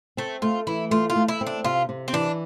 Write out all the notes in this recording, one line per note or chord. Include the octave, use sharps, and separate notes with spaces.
A3 C4
A3 F4
E3 E4
A3 F4
F4
A3
E4
C4
D4
C3 F4
C3
C4
E3 D4